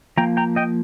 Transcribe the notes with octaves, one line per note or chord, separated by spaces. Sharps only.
F3 A#3 G5 A#5
G5 A#5
D#5 G5